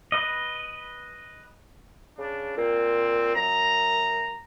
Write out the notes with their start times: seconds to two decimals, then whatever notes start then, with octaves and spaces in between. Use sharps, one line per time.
0.12 B4 D#5
2.18 C#3 D4
2.57 A#2 C4
3.35 F#2 A#5